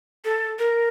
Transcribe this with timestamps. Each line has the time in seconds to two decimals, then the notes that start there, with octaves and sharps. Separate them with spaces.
0.25 A4
0.59 A#4